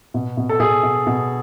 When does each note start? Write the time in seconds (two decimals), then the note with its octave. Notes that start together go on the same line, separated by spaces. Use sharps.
0.14 B2
0.37 B2
0.49 A4
0.60 B2 G#4
0.83 B2
1.07 B2